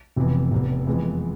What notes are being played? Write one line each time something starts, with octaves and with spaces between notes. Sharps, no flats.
F1 F2 C3 E3 B3
F1 E2 C3
F2 E3 G#3 B3